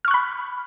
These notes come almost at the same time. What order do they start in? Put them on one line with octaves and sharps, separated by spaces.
F6 C#6 F#6 B5